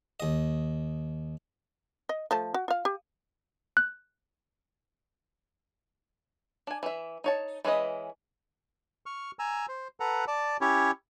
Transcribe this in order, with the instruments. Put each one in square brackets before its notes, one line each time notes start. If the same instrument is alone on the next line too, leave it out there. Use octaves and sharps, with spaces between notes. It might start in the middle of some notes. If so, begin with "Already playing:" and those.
[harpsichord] D#2 D#5
[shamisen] D#5
F3 A3 A5
F#4
F4 F5
G4
[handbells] F#6
[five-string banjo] D4 G#5
E3 E5
D#4 C#5 A5
E3 G#3 C#4 B4 D#5
[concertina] C#6 F6
G#5 A#5 E6
C5
A4 B4 F#5 A#5
D5 A5
C#4 E4 G4 C#5